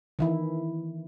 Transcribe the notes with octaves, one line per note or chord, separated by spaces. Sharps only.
D#3 E3 E4